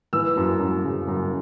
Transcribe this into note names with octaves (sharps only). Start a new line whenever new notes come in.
E3 E6
F#2
F#2
C#3
F#2